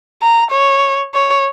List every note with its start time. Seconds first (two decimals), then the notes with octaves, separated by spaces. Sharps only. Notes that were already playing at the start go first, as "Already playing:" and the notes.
0.22 A#5
0.52 C#5
1.14 C#5